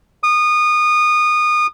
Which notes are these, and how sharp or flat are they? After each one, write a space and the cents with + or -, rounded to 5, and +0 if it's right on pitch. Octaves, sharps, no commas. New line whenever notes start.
D#6 -25